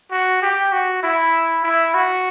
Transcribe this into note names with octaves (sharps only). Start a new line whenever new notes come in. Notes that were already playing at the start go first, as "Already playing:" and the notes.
F#4
G4
F#4
E4
E4
F#4